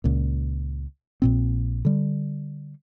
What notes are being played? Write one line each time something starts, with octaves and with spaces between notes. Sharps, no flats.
C#2 A#2
A#1 A#2 C4
D3 G3